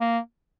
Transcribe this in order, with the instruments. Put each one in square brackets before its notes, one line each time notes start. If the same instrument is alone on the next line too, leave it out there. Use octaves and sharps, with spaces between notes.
[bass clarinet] A#3